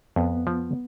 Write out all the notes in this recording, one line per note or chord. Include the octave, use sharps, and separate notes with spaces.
F2 B3
F3